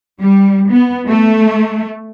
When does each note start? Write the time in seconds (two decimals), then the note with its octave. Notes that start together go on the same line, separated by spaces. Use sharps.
0.19 G3
0.71 B3
1.07 A3